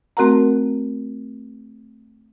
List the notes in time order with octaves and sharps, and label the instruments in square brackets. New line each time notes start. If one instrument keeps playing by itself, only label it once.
[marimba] A3 C4 F#4 A#4 F#5 A#5